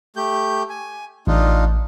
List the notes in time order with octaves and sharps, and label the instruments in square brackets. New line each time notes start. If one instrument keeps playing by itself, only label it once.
[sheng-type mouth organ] A3 G4 G6
G#5
[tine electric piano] A1 [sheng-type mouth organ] D4 D#4 F4